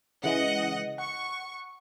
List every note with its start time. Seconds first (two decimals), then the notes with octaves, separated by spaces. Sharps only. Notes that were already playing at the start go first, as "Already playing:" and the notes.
0.24 C#3 E3 G#3 D#5 F#5
0.98 F#5 C#6